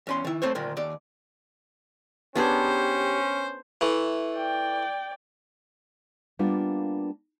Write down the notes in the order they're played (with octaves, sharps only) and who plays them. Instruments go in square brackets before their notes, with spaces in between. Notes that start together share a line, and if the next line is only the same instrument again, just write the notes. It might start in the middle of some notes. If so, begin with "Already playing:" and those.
[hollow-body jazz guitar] E2 C#4 C6
D#3 E4
A3 C4 C5 C#5
D2 A#2 D#3
D#2 D5
[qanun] B3 D4 G#4 [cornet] C#4 [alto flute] G4 [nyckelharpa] C5
[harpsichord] E3 A3
[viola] D5 G5
[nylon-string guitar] G3 A#3 B3 D4 F4